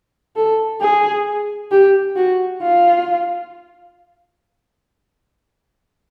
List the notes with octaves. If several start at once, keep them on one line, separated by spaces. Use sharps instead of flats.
A4
G#4
G4
F#4
F4